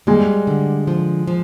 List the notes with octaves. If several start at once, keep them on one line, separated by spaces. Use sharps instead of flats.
G3 G#3
D3
F3
F3